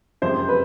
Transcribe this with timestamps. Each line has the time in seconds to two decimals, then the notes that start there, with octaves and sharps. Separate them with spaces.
0.22 F#1 F2 C3 F3 G#3 C5
0.49 B4